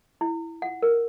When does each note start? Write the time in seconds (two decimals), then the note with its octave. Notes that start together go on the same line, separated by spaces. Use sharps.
0.21 E4
0.62 F#5
0.82 A#4